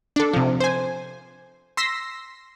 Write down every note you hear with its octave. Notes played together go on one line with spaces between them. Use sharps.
D4 A4
C3 F3
C5 G#5
C6 E6 A#6 B6